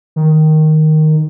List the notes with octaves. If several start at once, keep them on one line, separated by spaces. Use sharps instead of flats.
D#3